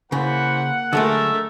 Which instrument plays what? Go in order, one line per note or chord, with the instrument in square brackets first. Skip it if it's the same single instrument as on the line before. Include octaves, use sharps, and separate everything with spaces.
[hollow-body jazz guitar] C#3 [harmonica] E3 C5 B5 [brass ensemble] A#3 F#5
[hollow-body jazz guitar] D3 F#3 G#3 [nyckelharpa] A3 A#4 [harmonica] E5 A5 E6